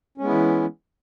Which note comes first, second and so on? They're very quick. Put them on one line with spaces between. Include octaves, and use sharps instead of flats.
C#4 G#3 B3 E4 E3